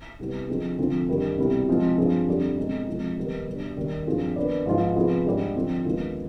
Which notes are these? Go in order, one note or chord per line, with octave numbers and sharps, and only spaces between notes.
C2 C3 G3 B3
D3 F3 C4 D#4 G#4
D2 C3 F3 C4
G2 D#3 G3
C2 B2 G3
C3 F3 G#3 C4
G2 F3 C4 F4 G#4
F2 D3 G3 D4 G4
B2 G#3 C4 D#4
C3 F3 G#3
D#3 G3 B3 D#4
B2 G3 D4
D#2 D#3 G3 D4 G4
G2 F3 C4 F4 G#4
D#3 B3 D4
G#2 F3 B3 F4
C3 F3 B3 F4 G#4
G#2 G3 D4 G4
D3 F3 C4
D#2 D3 G#3 B3 F4